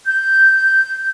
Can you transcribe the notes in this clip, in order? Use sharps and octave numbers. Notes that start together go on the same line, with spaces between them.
G6